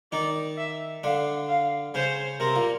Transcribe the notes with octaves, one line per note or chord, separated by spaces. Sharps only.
D#3 D#4 D5
E5
D3 D4 F5
F5
C#3 C#4 C5
C3 C4 A#4
A#2 A#3